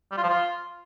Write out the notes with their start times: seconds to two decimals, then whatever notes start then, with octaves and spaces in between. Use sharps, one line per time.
0.11 G3
0.17 F4
0.23 F3
0.29 F4